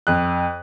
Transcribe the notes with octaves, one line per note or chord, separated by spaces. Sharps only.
F2 F#6